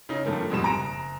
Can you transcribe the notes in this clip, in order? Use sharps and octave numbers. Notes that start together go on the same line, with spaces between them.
C#3 D#4
G2 D#3 F3 A3 A#3
F2 G#2 B2 G3 B5 E7
F#1 A#5 A#6 D7